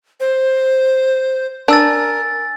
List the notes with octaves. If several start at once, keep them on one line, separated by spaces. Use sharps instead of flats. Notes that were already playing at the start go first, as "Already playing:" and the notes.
C5
D4 A#4 G#5 E6 A6